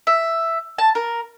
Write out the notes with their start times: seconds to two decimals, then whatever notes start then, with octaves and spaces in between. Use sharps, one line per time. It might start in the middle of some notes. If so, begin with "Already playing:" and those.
0.07 E5
0.78 A5
0.95 A#4